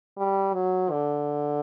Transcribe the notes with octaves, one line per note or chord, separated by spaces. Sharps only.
G3
F#3
D3